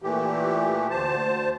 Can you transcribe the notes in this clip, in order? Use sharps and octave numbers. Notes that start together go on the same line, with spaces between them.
A#2 E3 A3 G4
D2 C5 A5